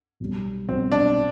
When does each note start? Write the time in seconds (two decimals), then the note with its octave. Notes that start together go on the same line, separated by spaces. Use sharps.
0.20 B1 B2 G3
0.68 B1 B2 G3 C4
0.92 D4
1.16 D4